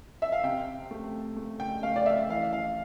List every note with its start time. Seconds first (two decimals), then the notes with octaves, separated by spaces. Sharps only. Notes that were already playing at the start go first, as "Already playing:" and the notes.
0.22 E5
0.32 F5
0.43 C3 G5
0.91 A3
1.36 A3
1.60 G5
1.83 A3 F5
1.96 D5
2.06 E5
2.29 E3 F5
2.53 F5